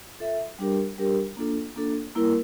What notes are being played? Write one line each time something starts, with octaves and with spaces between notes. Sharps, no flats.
F4 A4 E5
G3 D4 G4 A#4
G3 D4 G4 A#4
A#3 D4 F4 A4
A#3 D4 F4 A4
G3 A#3 E4 A#4